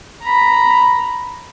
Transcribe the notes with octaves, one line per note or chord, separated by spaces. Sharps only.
A#5 B5